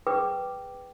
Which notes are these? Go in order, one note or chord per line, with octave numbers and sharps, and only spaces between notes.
G#4 B4 G5 D6